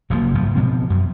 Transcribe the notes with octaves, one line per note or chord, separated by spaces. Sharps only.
F#1 C#3 F3 A#3
F#1 G#2 F3
B2 F3 C4
F#2